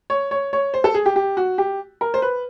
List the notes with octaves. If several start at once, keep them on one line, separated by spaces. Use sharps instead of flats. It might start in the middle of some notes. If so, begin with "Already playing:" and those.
C#5
C#5
C#5
C5
A4
G#4
G4
G4
F#4
G4
A#4
C5
B4